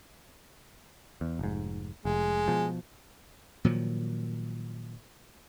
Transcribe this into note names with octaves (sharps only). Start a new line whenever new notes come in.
E2
F1 G#2
F1 G#3
B2 F3
A#2 D#3 F3 F#3